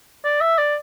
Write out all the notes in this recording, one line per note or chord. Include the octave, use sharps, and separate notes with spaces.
D5
E5
D5